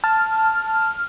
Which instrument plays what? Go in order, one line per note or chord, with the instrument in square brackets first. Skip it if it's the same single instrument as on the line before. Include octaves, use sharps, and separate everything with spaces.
[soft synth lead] A5 [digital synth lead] F6